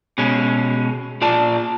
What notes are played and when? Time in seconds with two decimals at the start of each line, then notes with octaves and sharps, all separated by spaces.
0.18 B2 G#3 C#4
1.22 A#2 F4 D5 A5